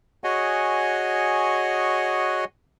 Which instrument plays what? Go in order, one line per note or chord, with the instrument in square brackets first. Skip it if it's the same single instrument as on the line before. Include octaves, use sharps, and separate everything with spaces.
[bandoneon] F#4 G#4 C#5 D#5 F#5 G#5